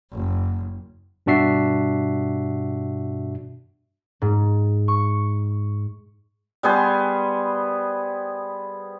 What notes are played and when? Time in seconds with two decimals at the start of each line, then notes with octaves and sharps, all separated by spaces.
0.12 F#1
1.26 G2 B2 D4 F#4 E5 C7
4.22 G#2
4.88 C#6
6.63 G3 B3 G#4 C5